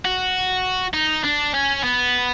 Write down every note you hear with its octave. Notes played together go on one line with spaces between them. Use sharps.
F#4
D#4
D4
C#4
B3